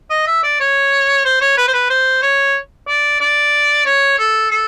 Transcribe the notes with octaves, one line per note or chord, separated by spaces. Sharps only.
D#5
E5
D5
C#5
C5
C#5
B4
C5
B4
C5
C#5
D5
D5
C#5
A4
A4